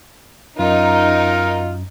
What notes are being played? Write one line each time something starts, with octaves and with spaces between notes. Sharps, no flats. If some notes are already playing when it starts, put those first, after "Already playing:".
F#2 D#4 F4 A#4